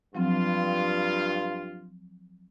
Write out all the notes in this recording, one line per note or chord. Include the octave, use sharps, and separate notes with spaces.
G2 F3 F#3 C4 F4